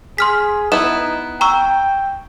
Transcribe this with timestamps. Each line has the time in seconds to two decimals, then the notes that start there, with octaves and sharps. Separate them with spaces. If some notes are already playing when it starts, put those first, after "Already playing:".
0.18 G#4 C6 F6 B6
0.72 B3 D#4 E4 E7
1.41 G5 A#5 C#6 E6